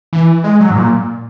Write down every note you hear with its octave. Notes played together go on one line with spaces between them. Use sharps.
E3
G#3
F#3
G#2
A#2